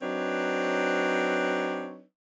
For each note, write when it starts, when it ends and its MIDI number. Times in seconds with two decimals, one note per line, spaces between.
0.02 2.04 54
0.02 2.04 60
0.02 2.04 62
0.02 2.04 63
0.02 2.04 71
0.02 2.04 73